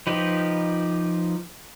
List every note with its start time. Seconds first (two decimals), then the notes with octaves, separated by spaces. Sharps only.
0.07 F3 D#4 G4 B4